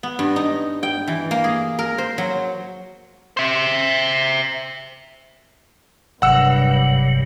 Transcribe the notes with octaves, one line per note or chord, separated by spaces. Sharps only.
B3
G2
D#4
G5
E3
A#3
G#4
A#4
C5
F#3
C5 E5
F#1 G2 C3 F#3 F#5 E6